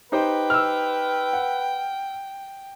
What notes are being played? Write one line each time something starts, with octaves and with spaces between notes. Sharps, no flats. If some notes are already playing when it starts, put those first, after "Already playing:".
D#4 G4 B4 C5 G5
E6 F6
F#5